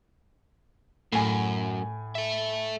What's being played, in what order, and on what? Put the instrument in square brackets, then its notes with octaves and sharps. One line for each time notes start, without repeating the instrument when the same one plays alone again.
[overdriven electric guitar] F#2 [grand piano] A2 G#5
[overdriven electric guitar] A4 E5